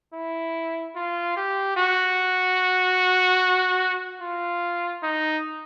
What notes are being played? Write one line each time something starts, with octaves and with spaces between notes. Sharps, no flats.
E4
F4
G4
F#4
F4
D#4